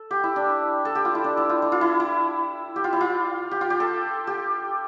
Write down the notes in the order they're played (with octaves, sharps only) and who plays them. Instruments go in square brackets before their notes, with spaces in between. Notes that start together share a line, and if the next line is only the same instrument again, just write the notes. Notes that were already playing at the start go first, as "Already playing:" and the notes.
Already playing: [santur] A4
G4
E4
D4
A4
G4
F4
E4
D4
E4
F4
E4
F4
E4
E4
G4
F4
E4
F4
G4
F4
G4
A4
G4